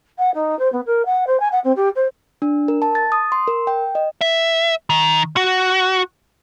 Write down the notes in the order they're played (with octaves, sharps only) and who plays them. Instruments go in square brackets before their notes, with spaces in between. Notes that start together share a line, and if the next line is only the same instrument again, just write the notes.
[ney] F#5
D#4
C5
B3
A#4
F#5
C5
G#5
F#5
C4
G4
C5
[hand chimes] D4
A#4
A5
A6
D#6
C6
A#4
G5
D#5
[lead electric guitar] E5
D#3
F#4